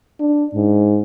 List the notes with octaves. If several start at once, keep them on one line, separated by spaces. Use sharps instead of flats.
D4
G#2